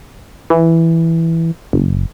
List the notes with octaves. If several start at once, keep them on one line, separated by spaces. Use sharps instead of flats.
E3
F#1